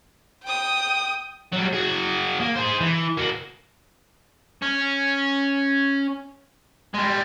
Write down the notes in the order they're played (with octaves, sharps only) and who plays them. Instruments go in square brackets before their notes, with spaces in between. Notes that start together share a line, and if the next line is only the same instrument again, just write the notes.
[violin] G5 D#6
[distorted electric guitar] F#3 G3
F#4 G#4
A#3
G#4 C5
E3
A#3 F#4
C#4
G3 G#3